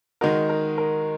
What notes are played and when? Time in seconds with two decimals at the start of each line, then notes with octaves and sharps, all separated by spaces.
0.21 D#3 G#3 D#4 F#4 A#4
0.49 A#4
0.78 A#4